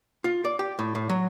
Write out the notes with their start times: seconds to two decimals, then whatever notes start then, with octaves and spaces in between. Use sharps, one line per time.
0.24 F4
0.45 D5
0.59 G4
0.79 A2
0.95 A2
1.10 F#3